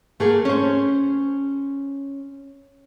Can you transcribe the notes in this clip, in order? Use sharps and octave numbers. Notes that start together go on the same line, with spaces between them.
G#2 A3 A#3 G#4
C#4 C5